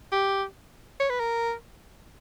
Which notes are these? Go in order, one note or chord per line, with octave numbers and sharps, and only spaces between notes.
G4
C#5
B4
A#4